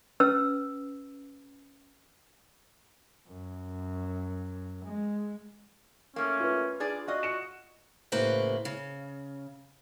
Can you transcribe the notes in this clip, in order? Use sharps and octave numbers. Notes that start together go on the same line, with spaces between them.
C#4 B4 E6
F#2
G#3
A2 A3 A#3 C#4
F4 B4
D4 G#4 D5
F4 F#4 D5 D#5
C#7 E7
A2 C#3 A#3 F#4 B4 C5
C#3